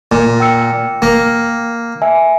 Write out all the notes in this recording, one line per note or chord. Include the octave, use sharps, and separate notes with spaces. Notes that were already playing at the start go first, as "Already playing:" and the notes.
A#2
G5 E6 C#7
A#3
E5 G#5